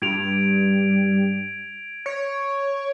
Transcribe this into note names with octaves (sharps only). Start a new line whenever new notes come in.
G2 G#6 D7 F7
C#5